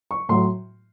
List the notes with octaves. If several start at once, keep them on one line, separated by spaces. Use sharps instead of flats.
C#6
A2 F#3 C6